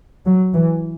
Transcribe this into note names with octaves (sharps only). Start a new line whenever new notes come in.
F#3
E3